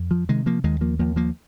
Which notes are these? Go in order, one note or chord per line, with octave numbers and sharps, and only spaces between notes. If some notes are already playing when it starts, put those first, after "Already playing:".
Already playing: F2
F3
C3 D#3 G#3
F3 A#3
D#2 D#3 G#3
F3 A#3
D#2 F3 A#3
F3 A#3